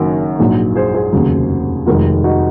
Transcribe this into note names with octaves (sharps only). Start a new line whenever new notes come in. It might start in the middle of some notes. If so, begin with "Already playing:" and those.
Already playing: F#1 F#2 D#3 F#4 A#4
A#1 G#2 F#3
G#4 C5
G#4 C5
F1 D#2 C#3 F#3
F1 F2 D#3 G#3 F#4 A#4
D#4 F#4